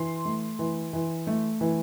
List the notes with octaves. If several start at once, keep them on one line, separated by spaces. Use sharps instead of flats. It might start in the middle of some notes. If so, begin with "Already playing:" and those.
Already playing: E3 C6
A3
E3
E3
A3
E3